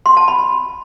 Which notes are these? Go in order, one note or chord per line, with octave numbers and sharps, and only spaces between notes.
C6
A5
B5